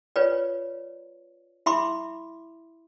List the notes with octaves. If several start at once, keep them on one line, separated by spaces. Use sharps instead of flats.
F4 B4 C#5 D5
E4 E5 B5 C6 D6